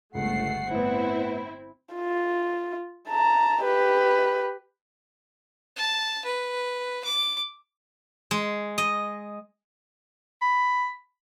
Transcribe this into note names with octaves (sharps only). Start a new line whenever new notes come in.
G1 C#2 A3 F#5 C7
A2 B3 C4 E4
F4
A5 A#5
G4 B4
A5
B4
D6
G#3
D#5
B5